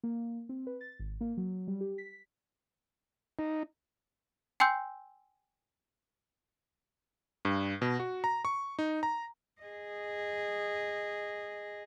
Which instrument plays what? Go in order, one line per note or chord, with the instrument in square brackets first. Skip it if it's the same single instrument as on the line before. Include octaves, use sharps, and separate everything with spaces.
[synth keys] A#3
C4
B4
A6
G#1
A#3
F#3
G3
G4
B6
[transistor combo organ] D#4
[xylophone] G5 G#5 C6 E6 G6
[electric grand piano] G2
B2
F#4
A#5
C#6
D#4
A#5
[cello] G#4 D#5